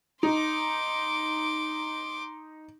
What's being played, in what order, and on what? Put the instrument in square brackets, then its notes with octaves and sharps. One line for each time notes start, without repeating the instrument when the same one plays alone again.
[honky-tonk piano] D#4 [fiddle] C6 D6